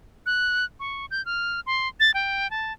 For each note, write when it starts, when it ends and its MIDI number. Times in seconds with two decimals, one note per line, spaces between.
0.26 0.65 90
0.80 1.06 85
1.11 1.24 91
1.26 1.60 89
1.66 1.88 84
2.00 2.11 93
2.14 2.50 79
2.50 2.73 81